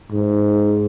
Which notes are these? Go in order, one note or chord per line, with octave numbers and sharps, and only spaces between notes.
G#2